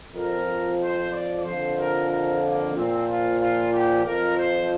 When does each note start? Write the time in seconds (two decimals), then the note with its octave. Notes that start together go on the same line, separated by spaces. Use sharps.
0.14 F2 F3 A#4
0.80 C5
1.13 D5
1.45 F2 D3 F3 C5
1.78 A#4
2.09 A#4
2.43 A#3
2.75 A#2 F3 C4
3.08 F4
3.40 F4
3.72 G4
4.05 F2 F3 A#4
4.37 C5